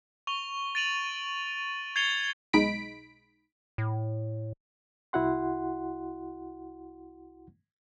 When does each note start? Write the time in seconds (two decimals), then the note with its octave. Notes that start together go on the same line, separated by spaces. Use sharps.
0.27 C#6 F7 G7
0.75 A6 D7 D#7 F7 F#7
1.96 G#6 A6 C7 C#7 F7 G7
2.53 B1 G#3 D#4 B5 B6 D7
3.78 A2
5.13 C2 E4 F#4 F#5 C6